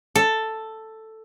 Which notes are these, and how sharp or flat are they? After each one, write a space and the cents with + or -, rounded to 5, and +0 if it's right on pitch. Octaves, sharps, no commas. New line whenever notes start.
A4 +5